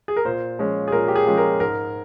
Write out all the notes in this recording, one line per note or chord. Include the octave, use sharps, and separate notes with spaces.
G#4
A#4
A#2 C5
F3 G#3 C#4
G#4
A#2 A#4
G4
G#4
F3 G#3 C#4
A#4
G#2 A#4